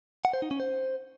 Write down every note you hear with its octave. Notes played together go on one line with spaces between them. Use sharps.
F#5
C5
D#4
C#4
C5